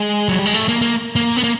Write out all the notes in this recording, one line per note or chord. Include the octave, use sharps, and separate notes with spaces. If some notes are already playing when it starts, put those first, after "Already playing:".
Already playing: G#3
F#3
G3
G#3
A3
A#3
A#3
A#3
B3
A#3